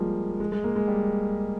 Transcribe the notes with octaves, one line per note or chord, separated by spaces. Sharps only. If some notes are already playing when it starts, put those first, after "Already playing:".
Already playing: F3 G3 G#3 A#3
G#3
G#3
A#3
G#3
G3